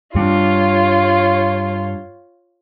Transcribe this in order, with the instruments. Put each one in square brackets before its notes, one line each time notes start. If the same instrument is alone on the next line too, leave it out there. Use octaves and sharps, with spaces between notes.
[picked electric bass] G2 G3 D4 [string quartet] F4 C#5